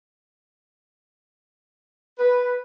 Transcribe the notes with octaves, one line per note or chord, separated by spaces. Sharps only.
B4